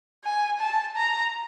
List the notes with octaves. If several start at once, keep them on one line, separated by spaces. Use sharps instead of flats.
G#5
A5
A#5